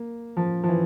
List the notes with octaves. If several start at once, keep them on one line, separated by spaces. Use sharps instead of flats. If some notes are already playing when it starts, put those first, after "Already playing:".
Already playing: A#3
F3
F3
E3